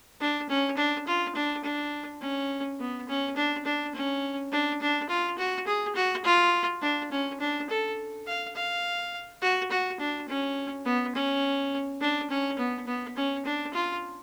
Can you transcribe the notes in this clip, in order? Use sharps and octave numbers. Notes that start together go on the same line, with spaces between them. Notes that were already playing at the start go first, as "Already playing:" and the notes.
D4
C#4
D4
F4
D4
D4
C#4
B3
C#4
D4
D4
C#4
D4
D4
F4
F#4
G#4
F#4
F4
D4
C#4
D4
A4
F5
F5
F#4
F#4
D4
C#4
B3
C#4
D4
C#4
B3
B3
C#4
D4
F4